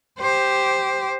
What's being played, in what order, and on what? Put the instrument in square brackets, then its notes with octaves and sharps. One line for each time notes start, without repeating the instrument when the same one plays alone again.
[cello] G4 C5